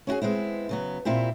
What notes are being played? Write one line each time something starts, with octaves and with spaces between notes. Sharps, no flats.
C#4 E4 F#4 G#4
G#3 B3 C4 E4
C#3 F#3 B3
A#2 C4 E4 F4 G4